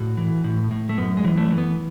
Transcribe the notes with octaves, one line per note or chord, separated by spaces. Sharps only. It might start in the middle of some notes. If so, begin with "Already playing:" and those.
Already playing: A2 F#4
E3
A2
A2
A3
F#2 B3
G#3
E3
A3
E3
B3